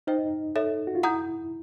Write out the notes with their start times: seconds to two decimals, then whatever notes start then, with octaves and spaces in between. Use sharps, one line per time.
0.07 D#4 C5 D#5 G5
0.56 A4 C#5 E5
0.87 F#4
0.95 F4
1.03 E4 F#5 A#5 D#6 G6